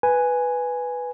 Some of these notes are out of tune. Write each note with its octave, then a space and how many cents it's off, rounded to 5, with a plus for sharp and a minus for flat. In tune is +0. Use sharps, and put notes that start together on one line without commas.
B4 +0 G#5 +0